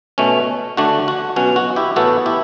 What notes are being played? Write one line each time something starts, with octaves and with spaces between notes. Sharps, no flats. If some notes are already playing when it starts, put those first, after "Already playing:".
B2 A3 C#4
D3 A3 D4 F#4
F#4
B2 F#3 C#4 F#4
F#4
E4 G4
A2 E3 B3 F#4 A4
E4 G4